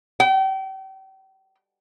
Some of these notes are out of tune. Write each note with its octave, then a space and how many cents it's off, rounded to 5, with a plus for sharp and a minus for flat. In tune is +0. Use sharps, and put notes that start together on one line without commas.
G5 -35